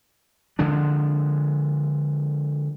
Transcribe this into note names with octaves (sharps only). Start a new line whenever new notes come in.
D3 F3 G#3 D4